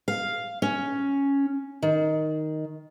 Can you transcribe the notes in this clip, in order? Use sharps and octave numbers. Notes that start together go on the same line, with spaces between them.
F5
C#4
D#3